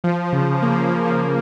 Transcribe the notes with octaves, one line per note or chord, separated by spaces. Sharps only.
F3
C#3
A#3
C#3
F3